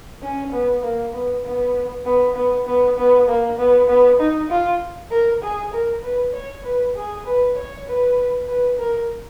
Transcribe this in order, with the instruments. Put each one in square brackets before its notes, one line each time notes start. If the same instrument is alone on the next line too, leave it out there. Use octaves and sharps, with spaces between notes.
[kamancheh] C#4
B3
A#3
B3
B3
B3
B3
B3
B3
A#3
B3
B3
D#4
F4
A#4
G#4
A#4
B4
C#5
B4
G#4
B4
C#5
B4
B4
A#4